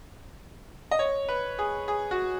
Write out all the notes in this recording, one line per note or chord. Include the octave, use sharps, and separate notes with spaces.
D#5
C#5
B4
G#4
G#4
F#4